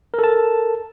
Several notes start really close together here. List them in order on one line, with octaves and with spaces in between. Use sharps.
A#4 A4 A5